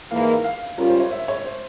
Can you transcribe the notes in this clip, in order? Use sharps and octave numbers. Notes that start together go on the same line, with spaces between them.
G#2 E3 A#3 F5
E5
F5
G3 C#4 F4 A#4
C5
C#5
E5
C#5
C5